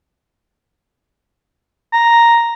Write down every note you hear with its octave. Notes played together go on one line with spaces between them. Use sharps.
A#5